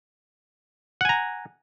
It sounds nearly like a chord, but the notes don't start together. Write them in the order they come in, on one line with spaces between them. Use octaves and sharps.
F#5 G#5 A#5